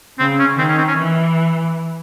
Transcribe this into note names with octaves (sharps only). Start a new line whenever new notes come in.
C#3 C4
C#4
D#3 C4
C#4
C4
C#4
E3